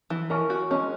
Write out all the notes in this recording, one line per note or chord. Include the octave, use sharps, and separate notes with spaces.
E3
C#4 A#4
F#4
G#3 C#4